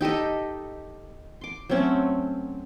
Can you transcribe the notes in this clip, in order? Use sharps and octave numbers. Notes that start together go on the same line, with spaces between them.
D#4 G4 A4 D#5
C6 D6
F#3 A3 C4 C#4